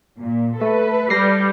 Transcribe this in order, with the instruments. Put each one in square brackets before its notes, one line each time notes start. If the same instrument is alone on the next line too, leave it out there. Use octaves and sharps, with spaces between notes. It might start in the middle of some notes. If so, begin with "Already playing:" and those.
[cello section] A#2
[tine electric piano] A3 [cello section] A4 B4
[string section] G3 [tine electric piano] A#6 C7